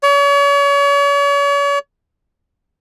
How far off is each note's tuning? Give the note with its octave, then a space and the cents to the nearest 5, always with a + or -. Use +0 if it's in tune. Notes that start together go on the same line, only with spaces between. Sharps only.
C#5 +40